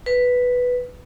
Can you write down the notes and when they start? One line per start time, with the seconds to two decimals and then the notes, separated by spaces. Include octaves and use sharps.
0.06 B4